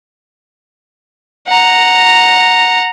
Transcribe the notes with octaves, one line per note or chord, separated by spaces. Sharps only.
F#5 A#5